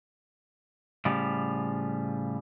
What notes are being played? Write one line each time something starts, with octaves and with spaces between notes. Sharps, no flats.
A2 C#3 F3 G3